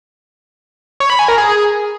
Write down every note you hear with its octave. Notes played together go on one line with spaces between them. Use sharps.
C#5
B5
G#5
A#4
G#4